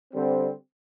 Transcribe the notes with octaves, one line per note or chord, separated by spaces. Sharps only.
D3 G3 C4